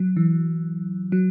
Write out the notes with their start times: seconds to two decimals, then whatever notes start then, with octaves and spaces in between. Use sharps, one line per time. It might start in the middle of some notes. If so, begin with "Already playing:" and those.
Already playing: F#3
0.17 E3
1.12 F#3